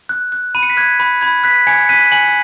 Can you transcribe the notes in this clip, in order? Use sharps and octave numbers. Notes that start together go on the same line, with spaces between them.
F#6
F#6
B5 D#7
C#7
B6
F#6 G#6
B5
B5 G#6
F#6 B6
G#5 G#6 C#7
C#7
F#6 B6 D#7
G#5 C#7 F#7